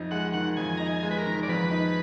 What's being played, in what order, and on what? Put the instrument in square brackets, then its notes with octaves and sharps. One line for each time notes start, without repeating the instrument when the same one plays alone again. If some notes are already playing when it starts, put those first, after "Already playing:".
Already playing: [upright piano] F2 D#4
[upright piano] G#3 [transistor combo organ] F#5
[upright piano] D#3 [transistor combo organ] F#5
[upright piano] F2 [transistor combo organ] G#5
[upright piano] D#4 [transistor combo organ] A#5
[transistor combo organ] G#5
[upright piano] G#3
[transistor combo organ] B4
A#4
[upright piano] D#3
[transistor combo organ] D5
[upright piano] F2 [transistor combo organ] B4
[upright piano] D#4